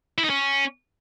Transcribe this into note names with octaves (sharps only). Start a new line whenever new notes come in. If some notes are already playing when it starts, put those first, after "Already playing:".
E4
D#4
C#4